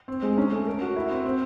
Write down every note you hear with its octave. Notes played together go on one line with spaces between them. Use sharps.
C4
G#3
C#4
A3
A#4
F#4
E4
C4
C4